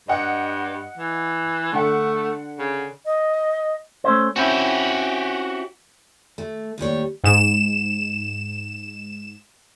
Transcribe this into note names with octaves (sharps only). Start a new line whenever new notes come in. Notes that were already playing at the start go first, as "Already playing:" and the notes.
G2 D#5 F#5
E3
D3 A3 F#5
C#3
D#5
A3 C#4 C5
C4 C#4 E4 F#4 G4
A3
D#2 A2 G3 C#5
G#2 E7